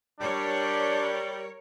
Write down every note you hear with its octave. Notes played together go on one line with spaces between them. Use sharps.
G3 D4 A#4 C#5